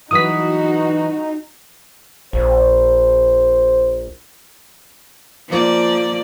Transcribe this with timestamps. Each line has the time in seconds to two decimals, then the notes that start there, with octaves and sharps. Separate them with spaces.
0.11 E3 F#3 D#4 F#4 B4 D#6 B6
2.33 A#1 C5
5.48 F3 A#3 D5